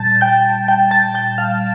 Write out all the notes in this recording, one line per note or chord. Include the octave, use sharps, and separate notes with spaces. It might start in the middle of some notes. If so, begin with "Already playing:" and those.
Already playing: A#2 G3 A5 G6 A6
G5 G6
G5 G6
A5 A6
G5 G6
F5 F6